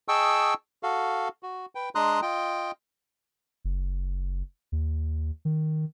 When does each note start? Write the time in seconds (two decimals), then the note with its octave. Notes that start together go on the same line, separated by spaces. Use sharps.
0.08 G#4 D#5 G5 A5 C#6 E6
0.83 F#4 A4 F5
1.43 F#4
1.75 B4 G5
1.95 G#3 D4 A#5 C6 D#6 F#6
2.22 F4 D#5 G5
3.65 F#1
4.72 D#2
5.45 D#3